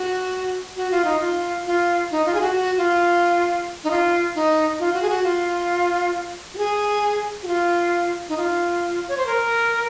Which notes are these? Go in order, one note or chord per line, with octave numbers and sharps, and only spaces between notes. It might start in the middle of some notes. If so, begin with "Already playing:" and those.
Already playing: F#4
F#4
F4
D#4
F4
F4
D#4
F4
G#4
F#4
F#4
F4
D#4
F4
D#4
F4
F#4
G#4
F#4
F4
F#4
G#4
F#4
F4
D#4
F4
C#5
C5
A#4